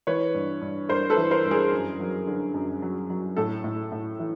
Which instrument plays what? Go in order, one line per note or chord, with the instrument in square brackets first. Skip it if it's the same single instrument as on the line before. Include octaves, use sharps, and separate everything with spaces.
[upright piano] E3 B4 C#5
G2
G2
G2 A#4 C5
A4 B4
E3
A#4 C5
G2
G#4 A#4
F#2
F#3
D3
F#2
F#3
F#3
A2 A4
A2
A2
E3